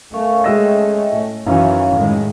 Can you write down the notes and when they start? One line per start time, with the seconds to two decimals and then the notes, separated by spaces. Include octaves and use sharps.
0.13 A3 C#4 A#4 F5 C#6
0.44 G#3 D#5 E5 G5 E6 A#6
1.12 A2
1.46 F#2 D#3 E3 C#4 E4 F5
1.95 A2 D#3 G#3